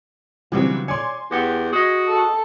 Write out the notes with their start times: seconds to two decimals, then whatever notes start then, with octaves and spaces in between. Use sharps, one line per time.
0.52 C#3 E3 F#3 G3 C4 D4
0.88 C#5 D5 G#5 C6
1.31 E2 G4 F#5 G5
1.73 F#4 G#4 D#5
2.09 A4